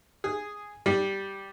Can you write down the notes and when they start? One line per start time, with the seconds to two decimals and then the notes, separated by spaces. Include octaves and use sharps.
0.24 G#4
0.86 G3